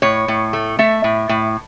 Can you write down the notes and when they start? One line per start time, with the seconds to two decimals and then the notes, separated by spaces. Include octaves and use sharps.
0.02 A2 C#5
0.28 A2
0.53 A3
0.79 A3 E5
1.04 A2
1.29 A2